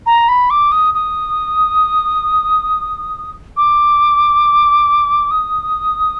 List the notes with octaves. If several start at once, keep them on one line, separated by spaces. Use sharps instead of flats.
A#5
B5
D6
D#6
D#6
D6
D#6